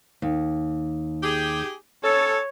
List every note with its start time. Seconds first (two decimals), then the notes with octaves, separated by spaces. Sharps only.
0.22 D#2
1.23 G4 G#4
2.04 C#4 A4 C#5